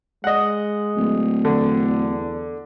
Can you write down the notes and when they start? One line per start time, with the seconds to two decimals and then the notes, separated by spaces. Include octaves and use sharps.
0.24 G#3 D#5 F#5
0.97 D1
1.45 E2 D3